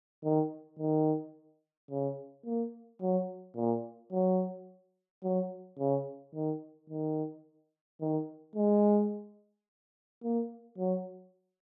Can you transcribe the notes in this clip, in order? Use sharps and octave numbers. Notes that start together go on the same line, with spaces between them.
D#3
D#3
C#3
A#3
F#3
A#2
F#3
F#3
C#3
D#3
D#3
D#3
G#3
A#3
F#3